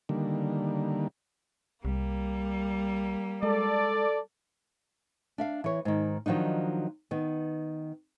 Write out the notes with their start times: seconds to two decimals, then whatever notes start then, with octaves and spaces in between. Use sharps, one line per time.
0.09 D3 D#3 G3 A#3
1.85 C2 G3 A#3
3.43 G#3 A4 D5
5.38 D4 E5 F5
5.64 E3 C#5
5.85 G#2 D#3
6.26 D#3 F3 F#3 D4 D#4
7.11 D#3 B3